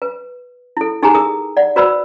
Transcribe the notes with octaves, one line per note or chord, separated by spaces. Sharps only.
B4
E4 A4
D#4 G4 G#4 G#5 A#5
G#4 A#4 D#6
D5 F#5
F#4 B4 C5 D5 B5 E6